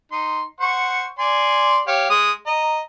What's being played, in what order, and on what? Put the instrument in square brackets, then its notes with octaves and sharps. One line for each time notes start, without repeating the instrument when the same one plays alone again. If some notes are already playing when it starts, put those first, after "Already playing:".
[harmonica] D#4 C6
C5 F#5 C#6
D5 G#5 C6
G4 C#5 F5
G#3 D#6
D#5 A#5